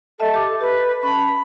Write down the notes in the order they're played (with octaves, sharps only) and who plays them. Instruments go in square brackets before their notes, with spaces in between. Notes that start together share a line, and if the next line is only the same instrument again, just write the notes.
[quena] A4 [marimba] D#5 E5 A5
[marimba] G4 D6
[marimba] G4 [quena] B4
[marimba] C#4 A5 [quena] B5